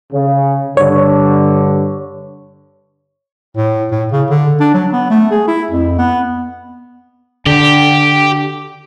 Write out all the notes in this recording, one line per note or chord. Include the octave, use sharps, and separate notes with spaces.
C#3
G2 D3 C#5
A2
A2
C#3
D3
D4
F#3
B3
A3
G#4
E4
F2
B3
D3 G4